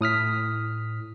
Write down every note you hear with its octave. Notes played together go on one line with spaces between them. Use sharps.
A2 D#6 F6 B6